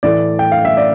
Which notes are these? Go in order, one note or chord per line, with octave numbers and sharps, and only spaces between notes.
A2 E3 A3 D5
G5
F5
E5
D5